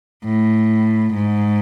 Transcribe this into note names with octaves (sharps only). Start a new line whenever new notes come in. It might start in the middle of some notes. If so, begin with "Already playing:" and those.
A2
G#2